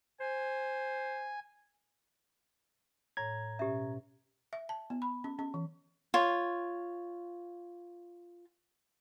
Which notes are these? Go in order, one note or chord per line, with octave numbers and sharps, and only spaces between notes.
C5 G#5
A2 C#5 A#5 G#6
B2 C#4 G4 E5
E5
A5
B3
B5
C#4
C#4
E3
F4 C#5